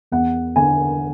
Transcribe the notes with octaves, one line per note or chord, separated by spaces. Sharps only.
E2 F#5
D3 G#5